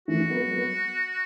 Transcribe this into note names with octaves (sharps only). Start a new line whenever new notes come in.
E3 A3 F#4
F#3 B3
F#3 B3